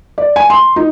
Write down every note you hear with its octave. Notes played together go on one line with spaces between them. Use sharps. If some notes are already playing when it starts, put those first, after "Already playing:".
D5
G#5
C6
D#4